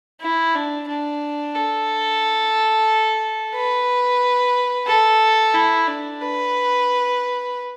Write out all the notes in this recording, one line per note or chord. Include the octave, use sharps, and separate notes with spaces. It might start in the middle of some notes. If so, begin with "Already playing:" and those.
E4
D4
D4
A4
B4
A4
E4
D4
B4